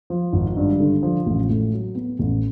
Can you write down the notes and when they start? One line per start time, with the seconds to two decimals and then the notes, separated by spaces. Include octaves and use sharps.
0.10 F3
0.33 G#1
0.57 G2
0.80 D3
1.03 F3
1.26 A1
1.49 A2
1.73 F#3
1.95 B3
2.19 A1